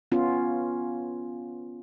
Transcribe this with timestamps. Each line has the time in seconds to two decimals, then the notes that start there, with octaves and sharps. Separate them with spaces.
0.12 B3 C#4 F4